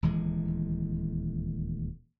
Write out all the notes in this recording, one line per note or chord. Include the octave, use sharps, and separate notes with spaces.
D#1 D2 E3 G#3